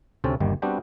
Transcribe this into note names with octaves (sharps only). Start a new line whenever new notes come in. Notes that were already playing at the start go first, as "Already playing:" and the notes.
D2 C3 A3 C4 C#4 A5
G1 D#2 D#3 G3
G3 B3 C4 D4 F#4 G4